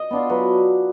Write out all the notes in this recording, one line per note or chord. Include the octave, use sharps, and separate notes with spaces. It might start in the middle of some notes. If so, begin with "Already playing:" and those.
Already playing: D#5
B3 D4 F4
F#3 B4